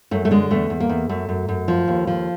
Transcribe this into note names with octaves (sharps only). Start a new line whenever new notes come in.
F#2 A3
A3
D3 G#3
E2 A3
E2
A#3
E2
F#2 A3
F#2
F#2
F3
D#2
F3